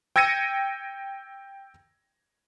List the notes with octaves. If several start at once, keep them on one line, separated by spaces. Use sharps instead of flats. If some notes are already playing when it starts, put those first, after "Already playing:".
G5 E6 G#6 A#6 C#7 D#7